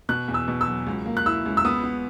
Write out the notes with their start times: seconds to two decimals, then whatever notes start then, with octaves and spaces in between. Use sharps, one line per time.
0.09 B2 F#6
0.28 E2
0.34 E6
0.48 B2
0.61 E6
0.67 F#3
0.86 C#2
1.06 A#3
1.17 F#6
1.26 E4 E6
1.46 C#2
1.57 E6
1.65 B3 D#6
1.84 B3